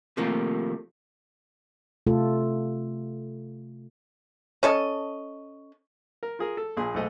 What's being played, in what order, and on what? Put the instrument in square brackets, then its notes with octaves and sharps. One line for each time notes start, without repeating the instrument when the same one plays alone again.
[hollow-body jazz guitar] C3 D#3 F3 A3 A#3
[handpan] C3 A3 F4 A4
[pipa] C#4 A4 D#5
[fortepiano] A#4
F4 G#4 A#4
A4
A#1 A#2 G#4 C6
B1 G#2 A3 D#5